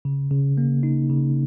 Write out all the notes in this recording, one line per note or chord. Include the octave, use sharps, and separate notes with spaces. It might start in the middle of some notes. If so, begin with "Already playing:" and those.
C#3
C#3
A#3
D#4
C#3